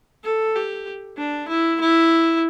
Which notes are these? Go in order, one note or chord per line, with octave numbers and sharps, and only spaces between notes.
A4
G4
D4
E4
E4